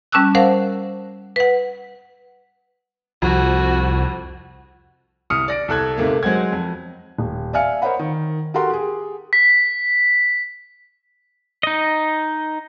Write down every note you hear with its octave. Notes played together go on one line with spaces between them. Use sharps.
G3 C#4 A5 D6 E6 F#6
A#4 C5 F5 F#5 A5
B4 F#5
C2 F2 F#4
C2 D#6 F6 C#7
D5 A#6 D7
C2 A4 F#6 G#6
G#2 C3 A3 A#3
F#3 G#3 C5 F#5 G#6
F2
D#1
D5 E5 F5 G#5 F6 C#7
A#4 C5 C#5 D#5 F#5 B5
D#3
F#4 G4 A4 A#4 F#5 C6
G4 G#4
B6
D#4 D#5